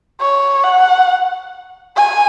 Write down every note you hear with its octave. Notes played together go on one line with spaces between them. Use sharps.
C#5
F#5
G#5